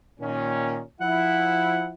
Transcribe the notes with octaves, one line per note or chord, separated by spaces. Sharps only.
A#2 D#3 C#4
F3 E4 F#5